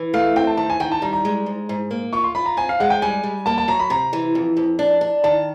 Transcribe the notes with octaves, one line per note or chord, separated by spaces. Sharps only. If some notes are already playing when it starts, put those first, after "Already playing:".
Already playing: E3
A3 F5
C4 G5
A5
D#3 A5
G#5
D#3 G5
A5
G3 A#5
A#5
G#3
G#2
G#2
A#3
F4 C#6
C6
F4 B5
A#5
C4 G#5
F5
G#3 F#5
G5
G3 G#5
G3
A#3 A5
A5
F#3 A#5
B5
C3 A#5
E3
F2
F2
D4
D4
D#3 A5